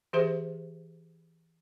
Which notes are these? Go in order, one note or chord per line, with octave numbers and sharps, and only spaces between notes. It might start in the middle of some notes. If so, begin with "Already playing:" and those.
E3 G4 G#4 C5 E5